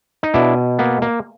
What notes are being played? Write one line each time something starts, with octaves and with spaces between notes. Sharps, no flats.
D#4
B2 D4 E4
A#3 B3
A#3